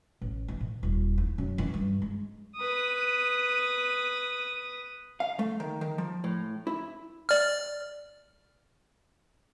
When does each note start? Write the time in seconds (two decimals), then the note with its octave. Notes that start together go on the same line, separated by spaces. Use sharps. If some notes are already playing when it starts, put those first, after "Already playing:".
0.21 A1
0.48 E3
0.61 A2
0.83 D#1
1.18 E4
1.38 F#2
1.58 E3
1.74 G2
2.02 G#3
2.56 B4 D#6
5.20 F5
5.39 A3
5.60 D#3
5.81 D#3
5.98 F3
6.24 A2
6.67 E4
7.29 D5 F6